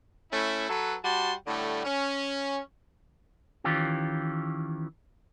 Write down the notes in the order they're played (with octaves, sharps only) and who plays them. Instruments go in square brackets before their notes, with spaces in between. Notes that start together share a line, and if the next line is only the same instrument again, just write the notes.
[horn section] A3 C#4 E4
F#3 A4 B4
G3 F#4 A5 C6
A2 D3 G3 A3
C#4
[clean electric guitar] D#3 E3 C#4 F4 G4